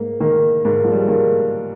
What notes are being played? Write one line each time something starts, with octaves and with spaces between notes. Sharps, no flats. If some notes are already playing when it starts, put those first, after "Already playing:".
Already playing: G#2 A#3
D#3 A#3
G#2 A#3
F3
G3
G#3
D#3 A#3